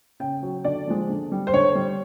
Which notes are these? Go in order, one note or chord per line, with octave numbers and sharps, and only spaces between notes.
C#3 G5
F#3
D3 D5
F3 G#3
D3
G3
C5
D3 C#5
G3